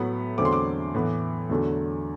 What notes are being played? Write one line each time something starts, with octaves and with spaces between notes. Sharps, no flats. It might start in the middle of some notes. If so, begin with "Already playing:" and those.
Already playing: A2 F#3 B3 B5
E2 D3 F#3 A3 C4 D6
C6
D6
A2 E3 B3
E2 D3 F#3 A3